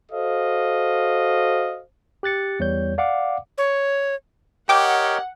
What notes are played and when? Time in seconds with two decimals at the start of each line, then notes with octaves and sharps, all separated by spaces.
0.12 F#4 A4 C5 D#5 F5
2.23 G4 F#6 A6 C#7
2.59 E2 G3 C#5 G6
2.98 D5 F5 F#5 D6
3.58 C#5
4.69 G4 A#4 C#5 D#5 F#5 G5 D6